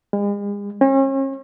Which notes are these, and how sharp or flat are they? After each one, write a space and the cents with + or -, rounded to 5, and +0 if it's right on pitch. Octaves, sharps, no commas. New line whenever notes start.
G#3 -40
C#4 -40